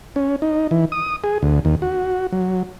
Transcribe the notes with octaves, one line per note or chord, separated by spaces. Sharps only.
C#4
D#4
E3
D#6
G#4
D2
D#2
F#4
F#3